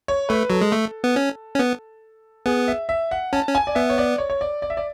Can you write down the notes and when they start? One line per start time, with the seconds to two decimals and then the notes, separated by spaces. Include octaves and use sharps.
0.08 C#5
0.29 A3 B4
0.50 F#3 A4
0.61 G#3
0.72 A3
1.04 B3
1.16 C#4
1.55 C#4
1.59 B3
2.46 B3 G#4
2.68 E5
2.89 E5
3.11 F#5
3.33 C#4 A5
3.48 C#4
3.55 G#5
3.67 D5
3.75 B3 E5
3.90 C#5
3.98 D5
4.18 C#5
4.30 C#5
4.41 D5
4.62 D5
4.70 E5
4.77 D5